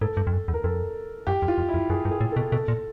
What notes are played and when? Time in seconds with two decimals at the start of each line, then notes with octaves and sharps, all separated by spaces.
0.01 G#2 A4
0.17 G2
0.27 F2
0.33 F#2
0.48 E2
0.54 A#4
0.64 F2 A4
1.27 F#2 G4
1.42 F2
1.48 F4
1.58 F2
1.69 E4
1.74 F2
1.90 F#2 G#4
2.05 G2
2.11 G#4
2.21 A2
2.32 B2 A4
2.52 B2 A4
2.68 A#2